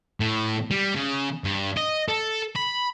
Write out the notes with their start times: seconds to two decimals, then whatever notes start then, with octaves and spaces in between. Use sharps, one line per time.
0.20 A2
0.71 G3
0.95 C#3
1.44 G2
1.77 D#5
2.09 A4
2.56 B5